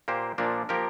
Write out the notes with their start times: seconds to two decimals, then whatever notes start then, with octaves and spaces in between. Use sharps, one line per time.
0.08 A#2 A#3 G4 C5
0.38 A#2 F3 A#3 D4
0.69 F3 A#3 G4 A#4